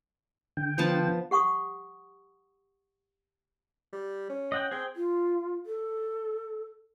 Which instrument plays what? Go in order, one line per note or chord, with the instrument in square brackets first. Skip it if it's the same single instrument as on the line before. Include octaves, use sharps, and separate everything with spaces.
[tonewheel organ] D3 G5
[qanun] F3 B3 A5
[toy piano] G4 F#5 C#6 D#6
[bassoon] G3
C#4
[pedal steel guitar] D#5 F#5 G5
[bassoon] C4 [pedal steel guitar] G#4 G5
[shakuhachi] F4
A4